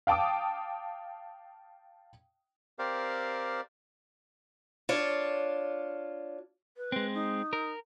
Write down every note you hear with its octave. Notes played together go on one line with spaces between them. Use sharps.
F5 G5 A5 D6 D#6
C4 G4 A#4 C5 D5 F5
D4 F4 C#5
B4
G#3 C4
D#4
A#4